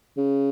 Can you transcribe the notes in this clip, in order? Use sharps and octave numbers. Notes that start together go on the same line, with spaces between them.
C#3